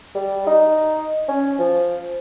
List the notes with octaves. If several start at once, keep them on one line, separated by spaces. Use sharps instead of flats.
G3
D#4
C#4
F3